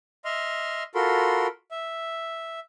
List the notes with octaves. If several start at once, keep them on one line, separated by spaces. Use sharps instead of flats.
D#5 E5 C6 F6
F4 F#4 A4 A#4 B5 C6
E5